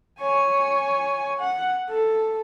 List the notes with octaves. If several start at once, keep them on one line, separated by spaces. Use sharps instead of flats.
C#5 G#5
F#5
A4